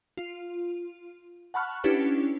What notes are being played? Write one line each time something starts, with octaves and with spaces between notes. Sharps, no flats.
F4
F#5 A5 B5 C#6 F6 F#6
C#4 D4 E4 G4 B4